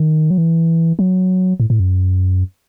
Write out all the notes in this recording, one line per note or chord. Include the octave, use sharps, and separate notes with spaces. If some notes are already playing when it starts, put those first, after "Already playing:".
Already playing: D#3
F#3
E3
F#3
A2
A2
F#2